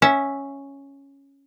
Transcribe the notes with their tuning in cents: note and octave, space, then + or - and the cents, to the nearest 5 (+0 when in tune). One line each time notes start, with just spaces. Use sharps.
C#4 +0 E5 -10